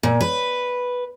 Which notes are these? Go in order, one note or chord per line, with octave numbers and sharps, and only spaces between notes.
A#2
B4